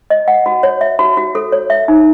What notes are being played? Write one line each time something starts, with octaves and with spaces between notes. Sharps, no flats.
D#5
F#5
F#4
C#5
E5
F#4
F#4
A4
C#5
E5
D#4